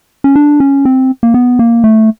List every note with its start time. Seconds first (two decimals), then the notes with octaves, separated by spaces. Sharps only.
0.24 C#4
0.36 D4
0.60 C#4
0.85 C4
1.23 A#3
1.34 B3
1.59 A#3
1.84 A3